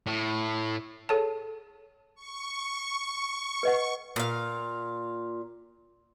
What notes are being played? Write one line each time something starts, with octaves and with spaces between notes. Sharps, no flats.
A2
G#4 A4 C#5 A5
C#6
B4 D#5 F#5
A#2 F5